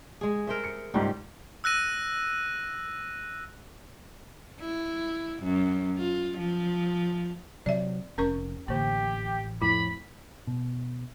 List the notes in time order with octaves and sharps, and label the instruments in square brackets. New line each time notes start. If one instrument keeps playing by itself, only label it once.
[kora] G#3 G#4
A#4 C5 E5
[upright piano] C#7
[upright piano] C#2 G#2 [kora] G3
[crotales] E6 F#6 A#6 D#7
[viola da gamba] E4
F#2
F4
F3
[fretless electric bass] C3 F#3 [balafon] D5 E5
[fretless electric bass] F1 [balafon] C#4 A#4 C#6
[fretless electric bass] A1 [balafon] D3 A#3 [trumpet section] G4
[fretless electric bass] F2 A2 [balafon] E4 [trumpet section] B5
[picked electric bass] B2